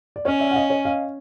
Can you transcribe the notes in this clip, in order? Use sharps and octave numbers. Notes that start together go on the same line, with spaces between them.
D5
C#4 C#5 D#5
D5 E5
F#5
D#5 F5
C#5 D#5
D#5 F5